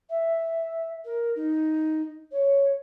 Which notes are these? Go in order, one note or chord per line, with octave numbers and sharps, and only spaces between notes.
E5
A#4
D#4
C#5